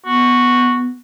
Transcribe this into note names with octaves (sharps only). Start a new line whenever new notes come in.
B3 F#4